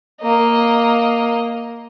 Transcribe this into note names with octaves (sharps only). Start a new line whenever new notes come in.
A#3 D#5